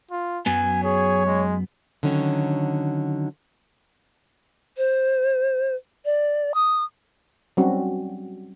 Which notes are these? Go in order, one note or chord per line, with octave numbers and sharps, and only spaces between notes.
F4
F#2 F#3 B3 G#5
G#4 C#5
G#3
D3 D#3 F#3 C#4
C5
D5
D#6
F#3 G3 C4 C#4 D#4 F#4